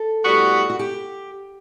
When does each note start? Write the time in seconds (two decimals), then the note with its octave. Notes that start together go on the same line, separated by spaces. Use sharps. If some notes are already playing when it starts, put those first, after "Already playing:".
Already playing: A4
0.23 A2 G3 B3 F#4
0.70 F#4
0.79 G4